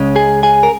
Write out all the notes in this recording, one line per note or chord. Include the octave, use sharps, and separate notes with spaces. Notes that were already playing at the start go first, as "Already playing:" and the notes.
Already playing: C#2 C#3 G#3 C#4
G#4 G#5
G#4 G#5
A#4